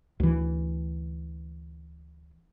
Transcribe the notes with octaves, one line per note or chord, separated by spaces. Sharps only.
D2 E3